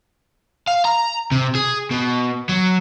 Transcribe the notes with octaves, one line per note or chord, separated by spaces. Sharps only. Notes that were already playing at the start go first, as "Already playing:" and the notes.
F5
A#5
C3
G#4
B2
F#3